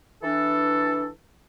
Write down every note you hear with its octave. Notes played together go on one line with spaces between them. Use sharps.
E3 D4 A4